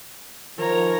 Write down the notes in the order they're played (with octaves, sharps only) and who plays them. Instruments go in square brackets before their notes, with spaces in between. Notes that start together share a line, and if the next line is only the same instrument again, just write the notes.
[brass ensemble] D#3 F3 [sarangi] A#4 [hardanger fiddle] C#5 A#5